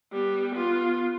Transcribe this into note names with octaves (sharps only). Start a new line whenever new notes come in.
G3 B3
B3 F4